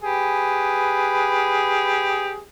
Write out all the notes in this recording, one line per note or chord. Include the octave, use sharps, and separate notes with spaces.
G4 G#4 B4